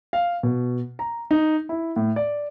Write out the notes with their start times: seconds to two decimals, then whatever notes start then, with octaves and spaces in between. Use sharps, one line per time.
0.13 F5
0.43 B2
0.99 A#5
1.31 D#4
1.69 E4
1.96 A2
2.16 D5